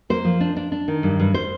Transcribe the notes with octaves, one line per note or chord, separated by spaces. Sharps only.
A#3 C5
F3
D4
D4
D4
D#3
G2
G2
C5